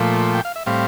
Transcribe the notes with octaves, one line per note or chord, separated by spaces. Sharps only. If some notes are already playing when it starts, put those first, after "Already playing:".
Already playing: A#2 F3 A3
G5
F5
E5
A2 G3 C4 F5